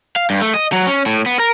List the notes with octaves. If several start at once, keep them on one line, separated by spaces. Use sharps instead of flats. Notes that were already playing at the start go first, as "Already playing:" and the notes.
F5
G2
A3
D#5
F#3
C#4
A2
B3
A#4